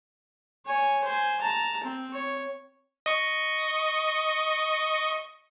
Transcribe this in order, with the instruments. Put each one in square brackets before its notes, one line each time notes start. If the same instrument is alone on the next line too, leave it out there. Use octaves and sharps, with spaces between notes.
[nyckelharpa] C#5 G#5
C5 G#5
A5 A#5
C4
C#5
[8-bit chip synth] D#5 C#6